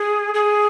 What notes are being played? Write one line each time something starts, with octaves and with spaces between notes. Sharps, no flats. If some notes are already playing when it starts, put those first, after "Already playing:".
Already playing: G#4
G#4